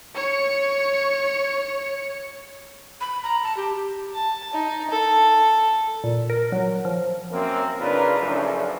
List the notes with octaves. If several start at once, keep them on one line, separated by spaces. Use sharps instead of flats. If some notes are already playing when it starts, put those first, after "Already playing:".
C#5 C#6
B5
A#5
A5
G4
A5
D#4
A4
A#2
A#4
F#3
F3
F#2 A#3 C4
C#3 D4 D#4 F4 A#4 B4
F#2 C#3 E3 F3 A3 D4